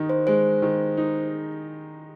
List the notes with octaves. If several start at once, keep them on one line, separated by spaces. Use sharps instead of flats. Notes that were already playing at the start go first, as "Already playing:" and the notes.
Already playing: D#3 D#4
C5
G#3 C5
D#3
D#4